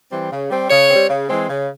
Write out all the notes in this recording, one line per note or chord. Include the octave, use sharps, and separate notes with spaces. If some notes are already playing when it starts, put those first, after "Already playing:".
E3 G3 C4
C#3
G3 C4
C#3 C#5
G3 C4
C#3
E3 G#3 C4
C#3